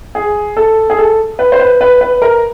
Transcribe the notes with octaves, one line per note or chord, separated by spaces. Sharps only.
G#4
A4
G#4
A4
B4
C5
B4
B4
B4
A#4